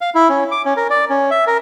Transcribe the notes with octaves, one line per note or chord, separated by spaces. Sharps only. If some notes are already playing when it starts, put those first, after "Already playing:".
F5
E4
C#4
D6
C#4
A#4
D5
C#4
E5
A#4